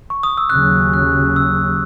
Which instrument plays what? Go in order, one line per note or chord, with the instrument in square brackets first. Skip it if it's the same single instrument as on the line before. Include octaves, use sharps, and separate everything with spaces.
[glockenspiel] C#6
D#6
E6
[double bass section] D#2 C#3 F#3 [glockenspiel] F#6
[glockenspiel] F#6
E6